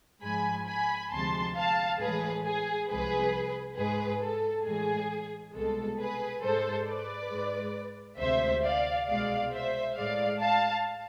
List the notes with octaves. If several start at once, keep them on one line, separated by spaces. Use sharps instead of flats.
G#2 F3 G#3 G#5 B5
G#5 B5
D2 C3 F3 G#3 A5 C6
F5 A5
A2 E3 G#3 G#4 B4
G#4
C2 C3 F3 G#3 G#4 B4
G#2 G#3 G#4 B4
A4
A2 E3 G#3 G#4
C2 B2 G#3 A4
G#4 B4
G#2 G#3 A4 C5
B4 D5
G#2 G#3
D2 C3 G#3 C5 E5
D5 F5
C2 B2 G#3 D5 F5
C5 E5
A2 G#3 D5 F5
F5 A5